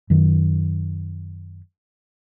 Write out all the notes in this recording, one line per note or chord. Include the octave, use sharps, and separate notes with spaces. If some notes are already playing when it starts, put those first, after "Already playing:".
F#2 D#3